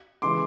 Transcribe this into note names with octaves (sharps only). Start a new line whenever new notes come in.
C#3 E3 G#3 C6 D6